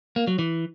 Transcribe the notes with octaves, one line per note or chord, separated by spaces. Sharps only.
A#3
F#3
E3